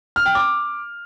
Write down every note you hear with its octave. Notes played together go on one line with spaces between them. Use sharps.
F6
G5
D6